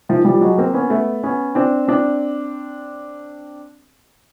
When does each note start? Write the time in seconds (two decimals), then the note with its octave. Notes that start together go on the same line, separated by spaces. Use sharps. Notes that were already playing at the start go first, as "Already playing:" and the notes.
0.09 D#3 F3
0.25 F3 G3
0.41 F#3 G#3
0.58 A#3 C4
0.74 B3 C#4
0.90 A3 B3
1.23 B3 C#4
1.55 C4 D4
1.88 C4 D4